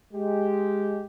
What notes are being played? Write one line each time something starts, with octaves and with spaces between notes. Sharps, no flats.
G#3 G4